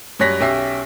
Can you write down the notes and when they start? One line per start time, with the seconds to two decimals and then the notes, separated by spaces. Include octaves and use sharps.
0.19 F#2 G3 C#5 F#6 A#6 B6
0.40 B1 C#4 G4 E5 C7